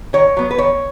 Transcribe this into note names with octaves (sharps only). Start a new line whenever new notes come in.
D#3 C#5
F#3 B3
B4
D#3 C#5